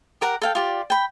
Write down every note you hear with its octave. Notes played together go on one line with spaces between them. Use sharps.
G4 A#4 F#5 A#5
A4 F5 G5
F4 G4 D5
G5 B5